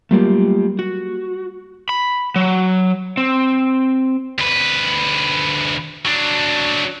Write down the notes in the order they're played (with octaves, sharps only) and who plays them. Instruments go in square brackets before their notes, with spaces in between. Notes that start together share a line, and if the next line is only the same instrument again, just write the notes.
[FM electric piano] F#3 G3 A#3 [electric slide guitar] A3 F4 G4
[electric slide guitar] F#4
[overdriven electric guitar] B5
F#3
C4
[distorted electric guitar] D2 B4
F#3 D4